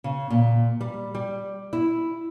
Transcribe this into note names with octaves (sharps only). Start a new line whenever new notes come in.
C#3
A#2
G3
G3
E4